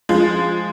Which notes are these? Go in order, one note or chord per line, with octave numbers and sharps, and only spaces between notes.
F3 G#3